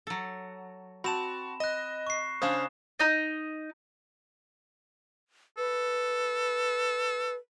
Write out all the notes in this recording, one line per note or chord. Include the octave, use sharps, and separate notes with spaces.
F#3 A4
C4 F#4 A5 B5 E7
D#5 F#6 A#6
C#6 C7
C#3 C#4 D4 C5 F5 D#6 E7
D#4 D#5
A4 B4